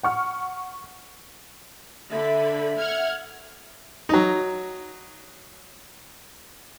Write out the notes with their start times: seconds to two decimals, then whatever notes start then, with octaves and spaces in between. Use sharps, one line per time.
0.03 F#5 C#6 F6
2.11 D3 E5 B5
2.77 F#5 F6 G#6
4.09 F#3 D#4